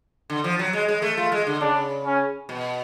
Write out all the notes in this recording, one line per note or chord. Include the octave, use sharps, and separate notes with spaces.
D3
F3
F#3
G#3
G#3
A3
A3 F4
G#3
D3
C#3 D4
C#4
B2